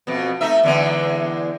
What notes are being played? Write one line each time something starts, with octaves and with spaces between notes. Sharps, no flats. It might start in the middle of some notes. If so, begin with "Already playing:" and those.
F2 B2
A3 D#4 E5
E2 D3 G#3